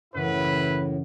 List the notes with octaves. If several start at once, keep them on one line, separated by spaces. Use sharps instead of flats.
F#2 A2 C#3 E3 E4 B4